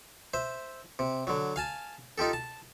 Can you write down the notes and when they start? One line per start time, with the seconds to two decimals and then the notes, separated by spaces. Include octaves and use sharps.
0.34 C5 E5
0.99 C3
1.27 D3 F#3
1.56 F5 G#5 A5
2.18 D#4 F4 G4 A4
2.33 A5